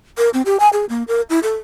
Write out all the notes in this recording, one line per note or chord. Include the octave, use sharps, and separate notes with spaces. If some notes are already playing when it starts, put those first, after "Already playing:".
A#4
C4
G4
G#5
G#4
A#3
A#4
E4
A4